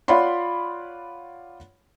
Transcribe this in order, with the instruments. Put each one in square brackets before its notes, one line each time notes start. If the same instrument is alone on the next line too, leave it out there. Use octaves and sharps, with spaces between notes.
[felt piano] F4 C#5 D5 F#5 B5 C6